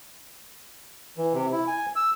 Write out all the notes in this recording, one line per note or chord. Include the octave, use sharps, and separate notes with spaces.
E3
C3
E4
G#5
E6